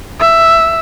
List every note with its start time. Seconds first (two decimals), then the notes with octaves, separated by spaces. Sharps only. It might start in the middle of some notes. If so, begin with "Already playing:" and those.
0.20 E5